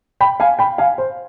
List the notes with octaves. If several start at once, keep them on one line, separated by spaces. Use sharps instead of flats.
G5 B5
F5 G#5
G5 B5
F5 G#5
C5